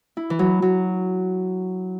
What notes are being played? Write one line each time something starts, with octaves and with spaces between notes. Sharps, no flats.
E4
E3
F#3
F#3